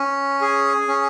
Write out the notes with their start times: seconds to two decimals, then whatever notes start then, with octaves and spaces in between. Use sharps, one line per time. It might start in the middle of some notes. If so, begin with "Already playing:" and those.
Already playing: C#4
0.41 G#4
0.88 C#4